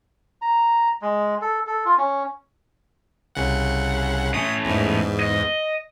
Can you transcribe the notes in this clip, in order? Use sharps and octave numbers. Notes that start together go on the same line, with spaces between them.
A#5
G#3
A4
A4
F4
C#4
C2 C#3 F#5
A2 C#4 D#6
E2 G#2
D#5